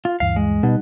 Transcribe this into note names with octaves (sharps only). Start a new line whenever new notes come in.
F4
D2 G2 E3 F5
G#3
B2 G3 D#4 F#5